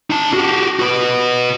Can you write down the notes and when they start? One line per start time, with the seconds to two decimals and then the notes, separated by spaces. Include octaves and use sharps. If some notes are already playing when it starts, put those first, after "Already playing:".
0.10 D#4 A5
0.34 F#4 G4
0.79 F#4 B4